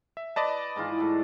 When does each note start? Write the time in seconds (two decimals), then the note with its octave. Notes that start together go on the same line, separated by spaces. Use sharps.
0.17 E5
0.36 B4 D5 D#5 A5
0.76 G#2 E3 F4
0.99 G#2 A3